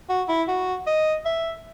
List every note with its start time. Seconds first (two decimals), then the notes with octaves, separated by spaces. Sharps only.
0.09 F#4
0.29 E4
0.48 F#4
0.87 D#5
1.25 E5